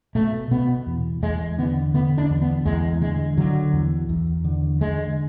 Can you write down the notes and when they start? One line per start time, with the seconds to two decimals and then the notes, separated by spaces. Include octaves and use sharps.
0.15 B2 A3
0.51 B2 B3
0.86 E2
1.22 E2 G#3
1.58 D3 B3
1.94 D3 B3
2.18 D4
2.30 E2
2.42 B3
2.65 E2 G#3
3.01 D3 G#3
3.37 D3 F#3
3.73 E2
4.09 E2
4.44 D3
4.81 D3 G#3